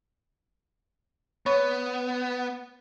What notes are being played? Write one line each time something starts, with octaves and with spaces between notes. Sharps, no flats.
B3 C#5 B5 C#6